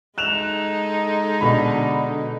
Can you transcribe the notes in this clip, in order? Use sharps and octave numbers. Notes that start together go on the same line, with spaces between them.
G#3 D#4 A4 F#6 E7 F7
B2 D3 B5